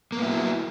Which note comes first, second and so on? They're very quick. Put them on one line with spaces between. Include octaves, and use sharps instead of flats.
A#3 B3 E4 F#3